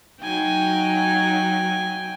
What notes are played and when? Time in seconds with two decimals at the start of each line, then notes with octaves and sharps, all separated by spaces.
0.21 F#3 D#4 G5 G#5